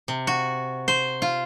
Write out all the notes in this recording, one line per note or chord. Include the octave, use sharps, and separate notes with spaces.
C3
F#4
C5
F4